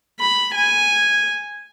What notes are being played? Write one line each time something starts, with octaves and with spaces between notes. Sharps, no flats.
B5
G#5